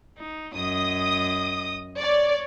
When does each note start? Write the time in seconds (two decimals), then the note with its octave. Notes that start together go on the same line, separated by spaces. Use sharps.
0.18 D#4
0.55 F#2 D#5 D#6
2.00 C#5 D5